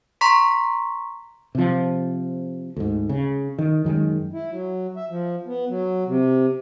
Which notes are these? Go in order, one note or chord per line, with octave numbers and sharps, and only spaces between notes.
A#5 C6 C#6 B6
C3 F3
D2 G#2
C#3
D#3
F#2 D#3 E3 G#3
E4
F#3
E5
F3
B3
F#3
C3